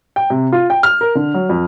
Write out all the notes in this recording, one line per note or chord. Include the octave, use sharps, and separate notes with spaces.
G5
C3
F4
G5
F6
A#4
D3
F#3
F2